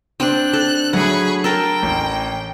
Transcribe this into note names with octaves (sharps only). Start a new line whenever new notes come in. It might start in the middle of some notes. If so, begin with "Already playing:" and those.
C4 D4 G5 F#6
A4
F#3 A3 G#4 F#5 B5 C#6
A4 A#4 G5 A5
A1